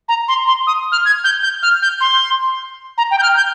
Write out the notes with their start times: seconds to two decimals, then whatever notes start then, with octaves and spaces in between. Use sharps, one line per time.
0.09 A#5
0.28 C6
0.47 C6
0.67 D#6
0.92 F6
1.05 G#6
1.24 G6
1.43 G6
1.63 F6
1.82 G6
2.01 C6
2.98 A#5
3.11 G5
3.19 G6
3.23 F6
3.37 G6